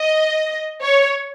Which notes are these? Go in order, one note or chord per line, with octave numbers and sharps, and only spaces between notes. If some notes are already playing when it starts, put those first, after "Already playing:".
Already playing: D#5
C#5